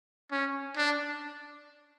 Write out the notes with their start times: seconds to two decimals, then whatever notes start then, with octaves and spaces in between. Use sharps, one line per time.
0.32 C#4
0.77 D4